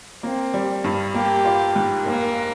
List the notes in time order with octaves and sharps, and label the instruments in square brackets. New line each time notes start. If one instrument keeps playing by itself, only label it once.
[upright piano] A#3 [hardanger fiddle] C4
[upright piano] G3
G2
[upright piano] A#3 [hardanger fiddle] G4
[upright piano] F4
G#2
[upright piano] F1 [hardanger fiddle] A#3